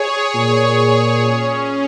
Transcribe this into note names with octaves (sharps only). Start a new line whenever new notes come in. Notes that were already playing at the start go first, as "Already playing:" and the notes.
Already playing: G#4 C#5
A#2
C#4